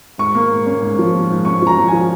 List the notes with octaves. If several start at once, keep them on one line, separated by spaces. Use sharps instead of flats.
G#2 C#6
A#3
G#2
C#4
G#2
F3
A#3
G#2
C#4 C#6
F3 A#5
F3
F3 G#5